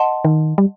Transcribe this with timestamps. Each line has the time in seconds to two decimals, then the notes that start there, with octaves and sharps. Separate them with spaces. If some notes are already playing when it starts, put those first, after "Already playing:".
Already playing: D#5 F#5 A5 C6
0.25 D#3
0.58 G3